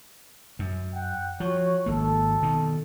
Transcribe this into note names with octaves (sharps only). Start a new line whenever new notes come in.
F#2
F#5 G5
F3 F#4 C#5
G#1 A#3 A4
B2 D#3